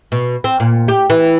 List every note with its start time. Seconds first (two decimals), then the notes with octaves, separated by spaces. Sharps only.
0.12 B2
0.44 C4
0.60 A#2
0.88 G4
1.10 E3